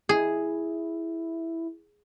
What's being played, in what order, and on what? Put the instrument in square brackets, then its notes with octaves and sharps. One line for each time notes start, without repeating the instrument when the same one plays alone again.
[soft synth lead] E4 [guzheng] G#4